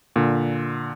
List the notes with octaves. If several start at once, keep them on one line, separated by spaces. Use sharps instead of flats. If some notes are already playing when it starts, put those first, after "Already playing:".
A#2 D3